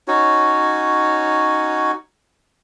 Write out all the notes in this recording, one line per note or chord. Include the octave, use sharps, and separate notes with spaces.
C#4 D#4 F#4 C#5